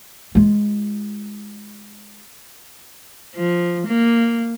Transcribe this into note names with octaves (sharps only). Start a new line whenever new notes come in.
G#3 F4
F3
A#3